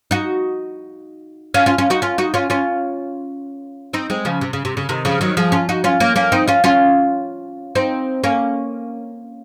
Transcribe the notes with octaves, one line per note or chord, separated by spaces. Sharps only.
D#4 F#4
C#4 F4
C#4 F4
C#4 F4
D#4 F#4
C#4 F4
D#4 F#4
C#4 F4
C#4 F4
C4 D#4
G#3 C4
C#3 F3
C3
C#3
C3
C#3
C3 D#3
C#3 F3
D#3 F#3
F3 G#3
C#4 F4
D#4 F#4
C#4 F4
A#3 C#4
A#3 C#4
C4 D#4
C#4 F4
C#4 F4
C4 D#4
A#3 C#4